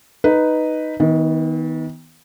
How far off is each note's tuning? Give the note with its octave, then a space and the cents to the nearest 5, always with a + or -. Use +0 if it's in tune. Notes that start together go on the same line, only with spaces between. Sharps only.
D#4 +0 B4 +0
D#3 +35 B3 +0